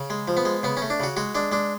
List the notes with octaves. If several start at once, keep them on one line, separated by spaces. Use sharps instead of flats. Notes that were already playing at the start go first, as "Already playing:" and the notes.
Already playing: C#3
G#3
F3
B3
G#3
C#3 B3
C#4
A3
D4
C#3 F#4
G#3 F#4
G#3 D4
G#3 D4